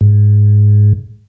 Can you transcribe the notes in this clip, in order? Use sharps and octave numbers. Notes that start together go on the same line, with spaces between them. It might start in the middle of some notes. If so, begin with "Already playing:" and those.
G#2